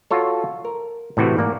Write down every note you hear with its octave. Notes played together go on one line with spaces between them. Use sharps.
F4 F#4 A4 C#5
A#4
A2 C3 E3 F#4
G#2 A#3 D5